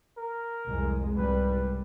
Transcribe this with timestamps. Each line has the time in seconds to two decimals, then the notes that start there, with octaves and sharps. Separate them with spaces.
0.18 A#4
0.67 C2 F2 G#3
1.17 C2 G#2 G3 B4